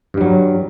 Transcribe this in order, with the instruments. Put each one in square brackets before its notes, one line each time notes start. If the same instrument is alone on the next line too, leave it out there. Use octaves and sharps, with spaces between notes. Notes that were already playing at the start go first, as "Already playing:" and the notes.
[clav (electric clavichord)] G2
G3
F#3